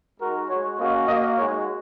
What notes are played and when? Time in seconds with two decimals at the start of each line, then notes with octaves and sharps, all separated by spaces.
0.20 G#3 D#4 F#4 A#4
0.49 G#3 F#4 C#5
0.79 A#3 C#4 F#4 D#5
1.08 A#3 F#4 D#5
1.37 G#3 D#4 F#4 C#5